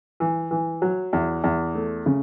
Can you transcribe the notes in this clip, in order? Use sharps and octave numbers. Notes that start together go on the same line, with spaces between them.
E3
E3
F#3
E2
E2
A3
C#3